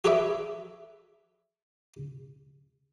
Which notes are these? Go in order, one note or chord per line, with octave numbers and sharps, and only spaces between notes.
F#4 G#4 A4 B4 D5 E5